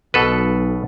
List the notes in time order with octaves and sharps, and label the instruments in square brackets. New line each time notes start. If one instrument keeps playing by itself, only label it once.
[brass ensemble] B1 [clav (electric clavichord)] B2 A4 B4